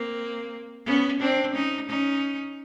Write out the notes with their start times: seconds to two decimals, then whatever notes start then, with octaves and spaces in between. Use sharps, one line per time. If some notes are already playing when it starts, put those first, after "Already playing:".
Already playing: A#3 C4
0.86 B3 C#4
1.20 C4 D4
1.54 C#4 D#4
1.89 C#4 D#4